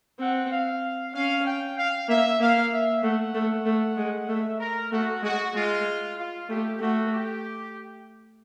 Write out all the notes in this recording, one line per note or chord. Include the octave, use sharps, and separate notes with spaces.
C4 F#5
F5
C#4 F5
G5
F5
A#3 E5
A#3 F5
E5
A3 F#5
A3
A3
G#3
A3 E5
A#4
A3 F#4
G#3 F#4
G#3 F4
F4
A3 G4
A3 F#4
G4